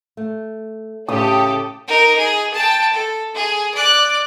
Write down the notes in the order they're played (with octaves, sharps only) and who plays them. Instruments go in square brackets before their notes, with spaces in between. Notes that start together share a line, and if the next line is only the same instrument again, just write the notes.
[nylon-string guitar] A3
[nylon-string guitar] A2 C#3 [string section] G4 A4 [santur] D#6
[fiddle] D#4 A#4
G#4
G5 A5
A4
G#4
D5 F#6